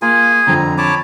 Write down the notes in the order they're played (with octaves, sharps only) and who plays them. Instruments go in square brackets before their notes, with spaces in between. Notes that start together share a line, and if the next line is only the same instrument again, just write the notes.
[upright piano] A#3 [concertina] F4 [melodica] G#4 G#5
[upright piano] F2 D3 [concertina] C4 A#5
[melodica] C#5 A5 D6 [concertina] B5